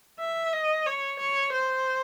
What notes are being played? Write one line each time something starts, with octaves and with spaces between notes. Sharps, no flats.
E5
D#5
C#5
C#5
C5